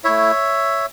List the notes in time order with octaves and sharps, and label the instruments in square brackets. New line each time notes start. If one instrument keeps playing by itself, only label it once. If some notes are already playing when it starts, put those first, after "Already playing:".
[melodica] A3 E4 C#5 E5